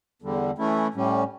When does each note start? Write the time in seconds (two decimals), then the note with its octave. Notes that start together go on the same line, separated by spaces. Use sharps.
0.22 E2 D3 G3
0.58 E3 A3 C#4 E4
0.94 A2 G3 C#4